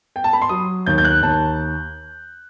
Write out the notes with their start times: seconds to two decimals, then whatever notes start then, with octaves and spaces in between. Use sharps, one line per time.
0.16 G5
0.24 A5
0.33 B5
0.42 C6
0.49 F#3 D#6
0.86 D#2 G6
0.98 G6
1.05 F#6
1.22 D#2 A5